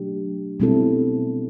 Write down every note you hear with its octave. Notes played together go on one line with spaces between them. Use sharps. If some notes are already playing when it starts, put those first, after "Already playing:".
Already playing: B2 F#3 A3 D4 G4
B2 G3 C4 E4 A4